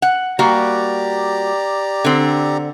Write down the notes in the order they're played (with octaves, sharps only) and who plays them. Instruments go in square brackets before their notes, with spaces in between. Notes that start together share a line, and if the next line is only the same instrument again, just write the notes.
[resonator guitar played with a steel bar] F#5
[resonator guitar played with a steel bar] G3 A#3 F#4 [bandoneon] G4 D5 A#5
[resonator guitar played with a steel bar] D3 C4